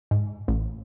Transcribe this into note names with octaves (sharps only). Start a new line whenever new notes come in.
G#2
A1